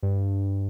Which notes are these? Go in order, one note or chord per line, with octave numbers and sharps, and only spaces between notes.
G2